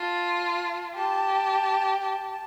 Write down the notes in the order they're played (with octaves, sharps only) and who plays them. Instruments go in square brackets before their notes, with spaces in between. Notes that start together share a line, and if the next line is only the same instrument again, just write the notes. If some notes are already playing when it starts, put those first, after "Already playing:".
Already playing: [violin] F4 [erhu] A5
[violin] G4 [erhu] A5
[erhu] A5